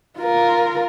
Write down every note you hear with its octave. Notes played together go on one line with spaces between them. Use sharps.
F4 A#4